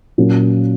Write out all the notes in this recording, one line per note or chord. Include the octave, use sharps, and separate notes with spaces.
A#2 F#3 A#3 C#4